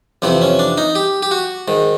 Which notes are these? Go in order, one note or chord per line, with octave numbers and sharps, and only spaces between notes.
F2 C3 E3 C4
C#4
D4
D#4
G4
G4
F#4
G#2 D#3